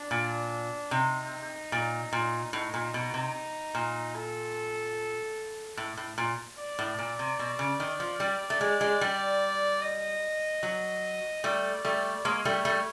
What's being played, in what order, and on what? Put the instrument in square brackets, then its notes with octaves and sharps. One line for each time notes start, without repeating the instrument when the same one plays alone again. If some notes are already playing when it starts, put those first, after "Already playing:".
Already playing: [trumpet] D4
[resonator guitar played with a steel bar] A#2
[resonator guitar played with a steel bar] C3 [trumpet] D#4
[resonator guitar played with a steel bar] A#2
A#2
[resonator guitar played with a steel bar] A2 [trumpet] D#4
[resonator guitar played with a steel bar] A#2
B2
C3
A#2
[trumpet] A4
[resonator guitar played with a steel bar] A2
A2
A#2
[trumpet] D5
[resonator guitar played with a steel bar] A2
A#2
C3
B2
C#3
D#3
F3
G3
A3
G#3
G#3
G3
[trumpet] D#5
[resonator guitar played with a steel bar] F#3
[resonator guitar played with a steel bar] G3 A3 [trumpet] D5
[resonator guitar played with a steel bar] G3 A3
[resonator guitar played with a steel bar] G#3 A#3 [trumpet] C#5
[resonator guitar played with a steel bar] G3 A3
G3 A3